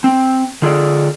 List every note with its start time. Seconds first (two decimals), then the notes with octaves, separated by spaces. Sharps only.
0.04 C4
0.62 D3 F4 G#4 A4 D5